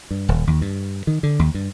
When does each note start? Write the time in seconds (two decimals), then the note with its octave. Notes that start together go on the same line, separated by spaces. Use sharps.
0.11 G2
0.29 D#1
0.47 D#2
0.61 G2
1.07 D#3
1.23 D3
1.39 D#2
1.55 G2